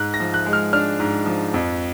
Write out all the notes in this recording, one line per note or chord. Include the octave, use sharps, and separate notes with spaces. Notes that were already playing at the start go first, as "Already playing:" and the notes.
Already playing: G#2 F#6
A#6
F3
F#6
G#3
F6
D4 F6
G#2
F3
F2